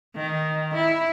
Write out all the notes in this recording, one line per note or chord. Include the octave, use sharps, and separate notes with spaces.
D#3
E4